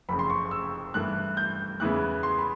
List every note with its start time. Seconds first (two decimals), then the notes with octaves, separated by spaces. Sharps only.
0.08 F#1 F2 C#3 B5
0.19 C6
0.30 C#6
0.51 E6
0.94 G2 E3 A3 F#6
1.37 G6
1.80 E2 C#3 E3 G#3 B3 F#6
2.23 C6
2.38 B5